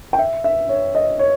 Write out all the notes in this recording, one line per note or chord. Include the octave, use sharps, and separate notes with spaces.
G5
E5
E5
C#5
D#5
C#5